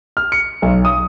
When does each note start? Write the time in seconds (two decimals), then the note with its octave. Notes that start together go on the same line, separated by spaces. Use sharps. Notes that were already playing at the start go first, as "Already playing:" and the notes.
0.17 F6
0.32 C#7
0.62 B1
0.85 D#6